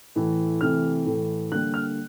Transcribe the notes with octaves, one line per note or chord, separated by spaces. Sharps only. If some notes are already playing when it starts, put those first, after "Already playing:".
A2 E3 A3
C3 E3 A3 F6
A2 E3 A3
D3 G3 A#3 F#6
F6